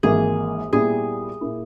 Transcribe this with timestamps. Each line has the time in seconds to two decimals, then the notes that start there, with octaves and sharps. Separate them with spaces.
0.03 G#1 G#2 E3 A#3 G#4
0.72 A#2 G3 B3 E4 G#4
1.41 A#2 A#3 E4